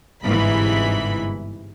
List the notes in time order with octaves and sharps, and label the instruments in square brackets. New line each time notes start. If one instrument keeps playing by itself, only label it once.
[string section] G1 G#2 C3 E3 B5